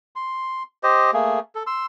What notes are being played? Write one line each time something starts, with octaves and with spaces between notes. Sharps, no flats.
C6
G4 C5 D#5
A3 A#3 G#4
A4
C6 E6